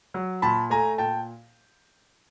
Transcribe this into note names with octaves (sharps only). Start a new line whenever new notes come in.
F#3
A#2 A5 B5
A3 G#5 A#5
A#2 G5 A5